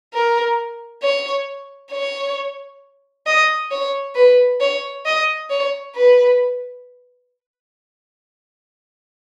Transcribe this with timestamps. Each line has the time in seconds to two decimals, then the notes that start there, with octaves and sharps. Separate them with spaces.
0.13 A#4
1.03 C#5
1.92 C#5
3.26 D#5
3.71 C#5
4.15 B4
4.60 C#5
5.05 D#5
5.50 C#5
5.95 B4